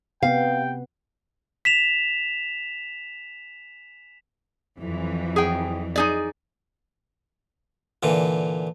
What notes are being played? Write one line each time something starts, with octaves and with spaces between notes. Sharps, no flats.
C3 B3 F5 G5
B6 E7 F7
F2 E3 F#3
G#4 G5
D#4 G#4 D5
A#2 D3 E3